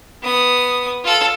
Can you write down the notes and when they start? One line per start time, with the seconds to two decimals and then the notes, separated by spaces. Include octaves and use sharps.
0.23 B3 D#6
1.04 F4 A4